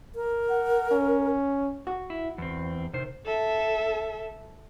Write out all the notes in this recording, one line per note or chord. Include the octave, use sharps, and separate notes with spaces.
A#4
F#5
C#4
F#4
E4
E2 C4
C3 D#3 C5
A4 E5